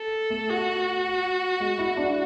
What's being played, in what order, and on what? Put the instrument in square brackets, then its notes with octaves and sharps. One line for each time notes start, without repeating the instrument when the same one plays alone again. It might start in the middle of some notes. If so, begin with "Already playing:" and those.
Already playing: [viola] A4
[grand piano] A3
[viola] F#4
[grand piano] G#3
E4
D4